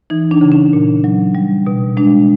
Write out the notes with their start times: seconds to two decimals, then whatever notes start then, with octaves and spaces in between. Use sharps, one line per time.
0.10 E3 D#4
0.31 D4
0.41 C#3
0.52 C#4
0.73 A#2
1.04 F#3
1.35 G3
1.67 B2
1.97 G#3 D4